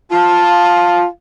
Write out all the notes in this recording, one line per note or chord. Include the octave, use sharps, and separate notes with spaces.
F4 A5